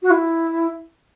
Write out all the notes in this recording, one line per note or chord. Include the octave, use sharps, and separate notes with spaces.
F#4
E4